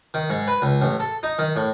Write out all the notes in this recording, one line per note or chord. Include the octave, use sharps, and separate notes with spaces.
D#3
G#2
B4
C#2
A1
A4
D#4
D#3
A2